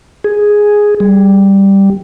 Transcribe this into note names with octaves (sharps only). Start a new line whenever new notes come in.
G#4
G3